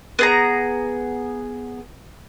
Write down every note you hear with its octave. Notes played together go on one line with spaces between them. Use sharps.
B3 G#4 A#5